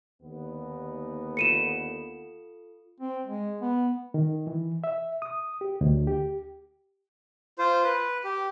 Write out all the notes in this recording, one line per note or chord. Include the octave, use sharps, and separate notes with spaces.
D#2 D3 B3
F4 A4 C#7 D#7 E7
C4
G#3
B3
D#3
E3
E5
D#6
G4
D2
G4
F4 C5
B4
G4